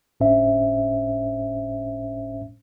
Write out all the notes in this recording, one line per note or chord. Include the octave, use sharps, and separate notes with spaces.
G1 A2 C#4 D4 C5 E5